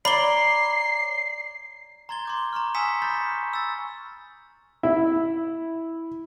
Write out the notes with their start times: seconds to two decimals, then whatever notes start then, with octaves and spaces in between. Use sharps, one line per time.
0.05 C#5 D5 A#5 B5 C7 G7
2.09 A#5 C6 G#6 A6 G7
2.25 C6 D6 G6
2.53 A#5 C6 C#6 F6
2.74 G#5 D#6 E6 B6 C#7 E7
3.02 B5 C#6 F6 G6 A6
3.52 B5 E6 A6
4.83 E4